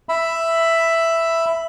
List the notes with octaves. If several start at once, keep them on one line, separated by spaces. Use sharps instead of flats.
E5 B5